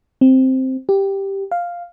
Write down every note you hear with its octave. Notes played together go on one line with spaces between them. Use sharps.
C4
G4
F5